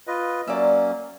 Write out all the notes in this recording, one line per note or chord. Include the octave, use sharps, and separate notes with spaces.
F4 B4 D#5
F#3 A#3 C#4 D5 E5